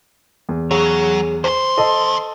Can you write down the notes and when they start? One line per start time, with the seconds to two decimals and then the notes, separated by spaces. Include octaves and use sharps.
0.49 E2
0.71 F#3 G#4 C#5
1.44 E2 C5 C6
1.78 A4 D#5